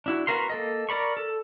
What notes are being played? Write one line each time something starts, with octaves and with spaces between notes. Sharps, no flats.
D4 E4 F#4
B3 F#4 A#4 F5 C6
A#3 A4 D#5
A#4 D5 B5 C#6
A4